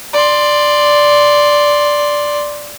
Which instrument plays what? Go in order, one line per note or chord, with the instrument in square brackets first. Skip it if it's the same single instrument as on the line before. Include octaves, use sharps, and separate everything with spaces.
[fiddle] D5 C6